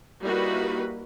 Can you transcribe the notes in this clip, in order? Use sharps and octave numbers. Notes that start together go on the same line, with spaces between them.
G3 A#3 D#4 E4 F#4 B4